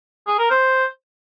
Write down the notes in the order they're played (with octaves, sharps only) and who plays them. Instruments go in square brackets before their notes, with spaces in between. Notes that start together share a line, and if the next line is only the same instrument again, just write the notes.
[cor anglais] G#4
A#4
C5